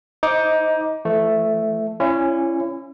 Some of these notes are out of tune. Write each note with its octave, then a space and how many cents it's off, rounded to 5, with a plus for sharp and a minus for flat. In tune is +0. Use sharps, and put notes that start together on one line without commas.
D#4 +20 C5 +0 D6 +0
E3 +45 A3 +0
C#4 -15 E4 +35 D5 -15